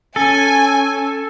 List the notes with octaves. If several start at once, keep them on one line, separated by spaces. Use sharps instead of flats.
C#4 A4 G#5